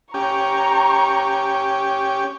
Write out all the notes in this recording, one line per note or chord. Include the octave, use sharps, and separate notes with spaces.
C#4 G4 A#5 C#6